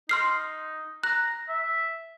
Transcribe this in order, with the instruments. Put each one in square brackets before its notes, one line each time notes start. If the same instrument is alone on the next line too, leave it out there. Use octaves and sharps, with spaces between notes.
[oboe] D#4 [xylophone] C6 F6 C7
[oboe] A#5 [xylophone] F#6
[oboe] E5